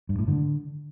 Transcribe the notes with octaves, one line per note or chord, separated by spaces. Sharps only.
G2
A2
D3